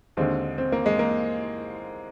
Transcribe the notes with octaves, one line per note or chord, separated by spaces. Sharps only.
D#2 D3 G#3 C4
C4
A#3
G#3
A#3